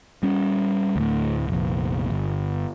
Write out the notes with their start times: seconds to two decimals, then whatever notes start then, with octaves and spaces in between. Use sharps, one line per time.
0.23 G3 C#4
0.96 D2 A2
1.48 F1 A#1
2.10 G1